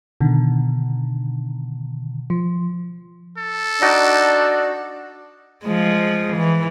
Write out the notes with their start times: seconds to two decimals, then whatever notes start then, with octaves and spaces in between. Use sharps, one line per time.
0.21 B2 D3 D#3
2.30 F3
3.38 A4
3.82 D4 D#4 F#4 D5
5.64 F3 G#3
6.37 E3